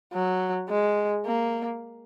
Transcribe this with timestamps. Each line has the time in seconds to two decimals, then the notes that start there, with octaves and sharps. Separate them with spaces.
0.13 F#3
0.69 G#3
1.25 A#3